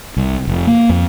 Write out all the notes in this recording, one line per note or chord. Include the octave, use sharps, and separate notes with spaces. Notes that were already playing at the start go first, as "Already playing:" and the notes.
C2
F1
A#3
F2